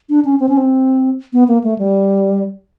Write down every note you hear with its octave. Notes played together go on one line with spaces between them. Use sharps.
D4
C#4
C4
C#4
C4
B3
A#3
A3
G3